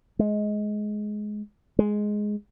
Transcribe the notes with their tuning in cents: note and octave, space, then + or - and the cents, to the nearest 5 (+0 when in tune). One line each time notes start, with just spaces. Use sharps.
G#3 +15
G#3 +5